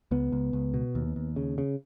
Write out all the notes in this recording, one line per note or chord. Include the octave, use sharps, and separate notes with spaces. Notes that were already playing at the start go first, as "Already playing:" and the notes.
C#2 B3
C#2
C#2
B2
D#2
D#2
C#3
C#3